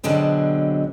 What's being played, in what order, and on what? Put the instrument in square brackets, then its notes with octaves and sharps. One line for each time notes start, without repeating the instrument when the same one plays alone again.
[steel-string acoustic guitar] B2 D3 F#3 G#3 C4 B4